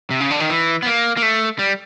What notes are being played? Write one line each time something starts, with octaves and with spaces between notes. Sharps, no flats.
C3
C#3
D3
D#3
E3
B3
A#3
A#3
A3
G3